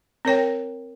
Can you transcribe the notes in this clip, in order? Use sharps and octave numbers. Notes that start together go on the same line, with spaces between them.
C4 A#4 C#5 G5